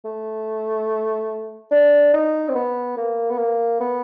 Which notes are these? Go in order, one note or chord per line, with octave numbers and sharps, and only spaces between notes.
A3
D4
D#4
C4
B3
A#3
B3
A#3
B3